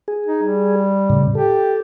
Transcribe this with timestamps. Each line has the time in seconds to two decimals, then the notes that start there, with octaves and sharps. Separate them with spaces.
0.08 G#4
0.26 D#4
0.43 G3
1.10 A2 C#3
1.35 G4 A4